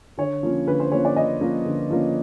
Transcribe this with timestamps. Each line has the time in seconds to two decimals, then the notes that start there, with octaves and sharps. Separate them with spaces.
0.17 D3 C#5
0.43 F3 A#3 C#4
0.67 D3 B4
0.80 C5
0.91 F3 A#3 C#4 C#5
1.05 D5
1.16 D3 D#5
1.41 F3 A#3 C#4
1.66 D3
1.90 F3 A#3 C#4